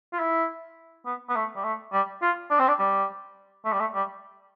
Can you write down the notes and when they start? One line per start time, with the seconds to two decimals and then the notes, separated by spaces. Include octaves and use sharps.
0.13 F4
0.19 E4
1.06 B3
1.29 B3
1.35 A3
1.56 G3
1.64 A3
1.93 G3
2.22 F4
2.51 D4
2.59 C4
2.68 D4
2.79 G3
3.65 A3
3.73 G3
3.80 A3
3.94 G3